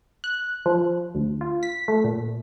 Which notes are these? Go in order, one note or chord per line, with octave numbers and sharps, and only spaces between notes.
F#6
F3
D2
F4
B6
A3
A#2